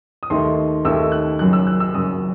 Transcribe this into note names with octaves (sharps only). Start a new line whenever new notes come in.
D#6
D#2 D#3 A3 D#4 C6
D#2 D#3 A3 D#4 E6
F#6
F#1 F#2 F#3 F#6
E6
F#6
E6
F#1 F#2 F#3 D#6